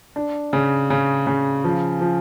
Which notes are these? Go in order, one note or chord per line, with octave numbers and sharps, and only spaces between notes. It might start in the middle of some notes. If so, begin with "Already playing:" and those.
D4
C#3
C#3
C#3
F3
F3